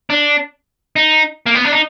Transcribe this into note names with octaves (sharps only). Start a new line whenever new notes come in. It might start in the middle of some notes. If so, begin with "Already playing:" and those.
D4
D#4
A#3
B3
D4
D#4